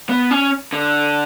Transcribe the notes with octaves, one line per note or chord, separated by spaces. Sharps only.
B3
C#4
D3